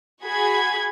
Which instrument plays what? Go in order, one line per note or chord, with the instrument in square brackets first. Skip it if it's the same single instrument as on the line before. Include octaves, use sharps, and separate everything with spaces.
[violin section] F#4 G#4 B5 G#6